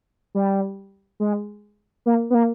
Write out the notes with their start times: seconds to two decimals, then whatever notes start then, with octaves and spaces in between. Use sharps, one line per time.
0.35 G3
1.20 G#3
2.06 A#3
2.30 B3
2.34 A#3